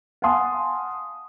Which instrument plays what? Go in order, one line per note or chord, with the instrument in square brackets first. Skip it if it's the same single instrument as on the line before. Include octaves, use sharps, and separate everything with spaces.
[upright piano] F5 F#5 G#5 A5 C6 D#6